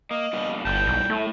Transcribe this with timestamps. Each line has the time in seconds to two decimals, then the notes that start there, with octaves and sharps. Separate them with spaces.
0.11 A#3 D#5
0.33 G2 B2 A#3
0.65 G1 A2 G3 G5 A5
0.87 B1
1.10 A2 A3